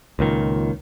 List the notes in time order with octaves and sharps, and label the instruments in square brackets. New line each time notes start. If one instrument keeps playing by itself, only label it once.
[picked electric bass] C#2 A#2 D#3